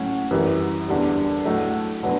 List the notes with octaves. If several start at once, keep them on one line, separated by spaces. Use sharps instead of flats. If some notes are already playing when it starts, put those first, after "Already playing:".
Already playing: A2 F#3 C#4 F#4
F#2 E3 G3
E2 D3 G3
A2 F#3 A3
D3 F#3 B3